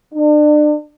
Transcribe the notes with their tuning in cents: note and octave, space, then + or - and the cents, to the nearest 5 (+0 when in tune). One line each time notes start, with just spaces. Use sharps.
D4 +35